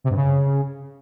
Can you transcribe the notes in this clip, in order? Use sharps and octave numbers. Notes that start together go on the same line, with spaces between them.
C3
G2
C#3